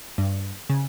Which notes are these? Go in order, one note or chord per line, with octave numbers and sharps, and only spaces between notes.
G2
C#3